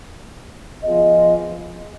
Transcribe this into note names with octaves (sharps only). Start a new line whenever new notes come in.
F3 B3 F4 G#4 D#5